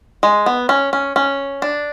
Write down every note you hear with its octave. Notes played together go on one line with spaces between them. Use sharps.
G#3
B3
C#4
C#4
C#4
D4